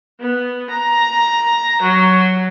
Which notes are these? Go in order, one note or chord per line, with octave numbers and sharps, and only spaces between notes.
B3
A#5
F#3